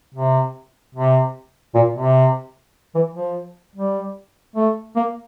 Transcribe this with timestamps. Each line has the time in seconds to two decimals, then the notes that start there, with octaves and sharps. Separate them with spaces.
0.15 C3
0.95 C3
1.75 A#2
1.95 C3
2.95 E3
3.15 F3
3.75 G3
4.55 A3
4.96 A#3